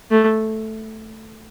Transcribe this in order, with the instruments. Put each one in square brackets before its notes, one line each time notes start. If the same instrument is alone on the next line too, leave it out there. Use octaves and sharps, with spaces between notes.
[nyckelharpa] A3